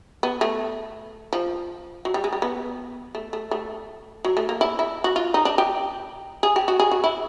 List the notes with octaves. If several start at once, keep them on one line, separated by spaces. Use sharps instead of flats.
B3
A3
F3
F#3
G3
G#3
G3
B3
A3
A3
A3
F#3
A3
A#3
E4
E4
F#4
F4
D#4
D4
G4
G#4
G4
F#4
G#4
F#4
E4